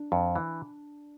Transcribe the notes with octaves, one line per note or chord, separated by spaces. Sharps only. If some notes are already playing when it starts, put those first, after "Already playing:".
Already playing: D4
F2
E3